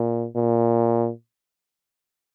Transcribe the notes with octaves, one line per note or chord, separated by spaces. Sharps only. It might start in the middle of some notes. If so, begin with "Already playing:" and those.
Already playing: A#2
A#2